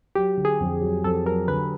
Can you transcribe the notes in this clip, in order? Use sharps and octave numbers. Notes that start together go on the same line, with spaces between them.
F#3 G4
D3
G#4
F2
F#3
F2 A4
F#3 A#4
D3 B4